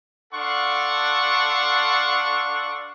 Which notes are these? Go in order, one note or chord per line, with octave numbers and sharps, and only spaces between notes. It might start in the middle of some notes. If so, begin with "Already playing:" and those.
D4 A4 F5 F#5 C6 C#6